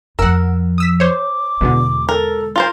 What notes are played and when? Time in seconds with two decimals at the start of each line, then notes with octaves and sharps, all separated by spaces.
0.19 F2 F3 A#4 F#5 E6
0.78 D#6 E6 B6
1.00 C5 C#5 D6
1.61 E2 B2 D3 G#3
2.09 A4 A#4
2.56 F4 A#4 C5